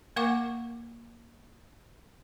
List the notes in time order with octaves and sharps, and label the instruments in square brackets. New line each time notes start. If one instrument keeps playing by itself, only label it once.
[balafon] A#3 A#4 F5 F#5 C#6 D6